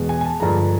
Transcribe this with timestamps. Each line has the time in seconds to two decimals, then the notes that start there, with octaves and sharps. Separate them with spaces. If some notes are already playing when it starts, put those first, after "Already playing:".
Already playing: E2 B2 G#3
0.09 G#5
0.21 G#5
0.25 A5
0.40 G2 D3 F3 G#3 A#5